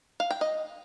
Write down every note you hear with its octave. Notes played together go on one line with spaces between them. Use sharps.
F5
G5
D#5